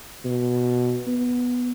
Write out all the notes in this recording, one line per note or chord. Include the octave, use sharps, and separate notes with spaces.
B2
B3